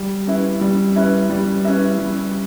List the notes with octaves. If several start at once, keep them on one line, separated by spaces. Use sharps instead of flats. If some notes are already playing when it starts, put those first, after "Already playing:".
Already playing: G3
C#4 E4 B4 E5
G3
C#4 E4 B4 E5
G3
C#4 E4 B4 E5
G3